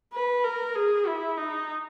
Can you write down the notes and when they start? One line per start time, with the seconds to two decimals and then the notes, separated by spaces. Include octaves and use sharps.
0.13 B4
0.44 A#4
0.75 G#4
1.07 E4
1.37 D#4